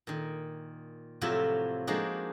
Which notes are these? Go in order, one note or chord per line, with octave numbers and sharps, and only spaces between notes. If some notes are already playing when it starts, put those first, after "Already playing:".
A#2 D#3
A2 C3 F3 F#3 F4 E5
F3 G#3 A#3 D4 D#4 F#4